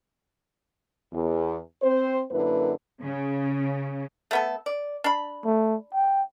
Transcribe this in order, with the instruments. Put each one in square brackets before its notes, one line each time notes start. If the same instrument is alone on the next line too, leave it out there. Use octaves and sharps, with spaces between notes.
[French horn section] E2
C4 C5
F#2 D3 A#3 E4 B4
[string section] C#3
[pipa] A3 B3 A4
D5
D4 B5
[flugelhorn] A3
G5